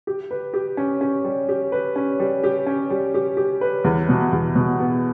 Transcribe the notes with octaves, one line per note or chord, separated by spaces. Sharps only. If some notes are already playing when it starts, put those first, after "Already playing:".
G4
B4
G4
C#4
C#4
G3
G4
B4
C#4
G3
G4
C#4
G3
G4
G4
B4
E2
B2
E2
B2
B3